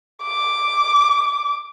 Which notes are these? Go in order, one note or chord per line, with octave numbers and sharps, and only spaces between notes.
D6